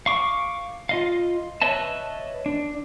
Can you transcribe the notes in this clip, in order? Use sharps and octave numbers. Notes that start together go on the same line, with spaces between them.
F5 C#6 D6
F4 D#5 F5
B4 C#5 D#5 E5 A5
D4